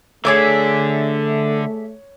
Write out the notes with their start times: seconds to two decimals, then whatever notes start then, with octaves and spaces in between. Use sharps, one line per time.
0.25 D3 A3 G#4 C#5 D5 E5